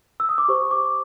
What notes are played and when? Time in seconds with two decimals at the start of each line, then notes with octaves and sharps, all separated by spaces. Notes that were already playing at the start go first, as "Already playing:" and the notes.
0.20 E6
0.29 D#6
0.38 D6
0.48 G4 C5 C#6
0.71 D6